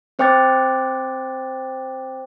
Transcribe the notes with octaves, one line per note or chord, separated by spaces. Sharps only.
C4 C5 G5 D6 F#6 A6